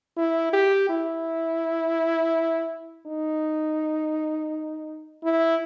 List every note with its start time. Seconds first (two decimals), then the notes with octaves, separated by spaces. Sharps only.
0.17 E4
0.53 G4
0.89 E4
3.07 D#4
5.24 E4